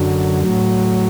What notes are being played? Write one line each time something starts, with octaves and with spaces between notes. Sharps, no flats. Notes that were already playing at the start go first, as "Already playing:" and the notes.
Already playing: F#2 D3 F#3
A2 F#3